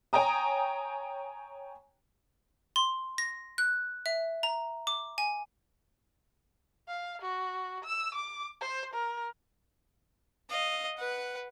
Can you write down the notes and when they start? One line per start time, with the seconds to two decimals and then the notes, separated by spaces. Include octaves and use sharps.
0.13 C#5 G5 G#5 A#5 D#6
2.76 C6
3.18 A#6
3.58 F#6
4.06 E5
4.43 A#5
4.87 D6
5.18 G#5
6.88 F5
7.22 F#4
7.84 E6
8.14 D6
8.61 C5
8.94 A#4
10.49 D#5 F5
10.98 B4 F#5